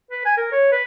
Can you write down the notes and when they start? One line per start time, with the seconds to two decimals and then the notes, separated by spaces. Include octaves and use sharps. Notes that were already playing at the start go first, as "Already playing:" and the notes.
0.11 B4
0.25 G#5
0.37 A#4
0.52 C#5
0.72 B4